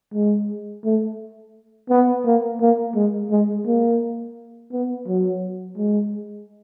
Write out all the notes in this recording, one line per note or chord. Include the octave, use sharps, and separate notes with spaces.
G#3
A3
B3
A#3
A#3
G#3
G#3
A#3
B3
F#3
G#3